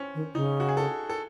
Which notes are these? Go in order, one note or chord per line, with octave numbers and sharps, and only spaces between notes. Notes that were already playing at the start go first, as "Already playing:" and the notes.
Already playing: C4 C#4
D#3
C#3 D#4
F#4
G#4
A4
A4